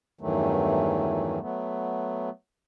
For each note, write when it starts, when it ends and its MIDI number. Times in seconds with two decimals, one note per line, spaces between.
0.21 1.39 40
0.21 1.39 43
0.21 1.39 51
0.21 1.39 52
0.21 1.39 54
0.21 1.39 57
1.41 2.29 54
1.41 2.29 57
1.41 2.29 59